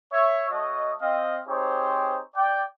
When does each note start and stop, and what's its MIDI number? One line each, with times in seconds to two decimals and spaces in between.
0.13 0.48 73
0.13 0.48 76
0.50 0.92 57
0.50 0.92 66
0.50 0.92 73
0.50 0.92 75
1.02 1.39 60
1.02 1.39 75
1.02 1.39 77
1.48 2.19 60
1.48 2.19 63
1.48 2.19 67
1.48 2.19 68
1.48 2.19 72
1.48 2.19 73
2.36 2.63 74
2.36 2.63 79